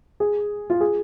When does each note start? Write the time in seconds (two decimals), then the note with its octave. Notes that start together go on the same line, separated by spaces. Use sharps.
0.20 G#4
0.70 F4
0.81 G#4